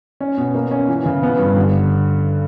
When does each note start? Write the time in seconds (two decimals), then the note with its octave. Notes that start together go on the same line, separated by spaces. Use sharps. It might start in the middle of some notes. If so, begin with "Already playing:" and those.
0.20 C#4
0.37 B2
0.55 A#3
0.71 C#4
0.88 E3
1.06 C#3
1.23 B3
1.39 G2
1.56 D3